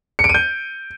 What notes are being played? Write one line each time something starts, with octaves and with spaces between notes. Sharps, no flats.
C#7
D7
D#7
G6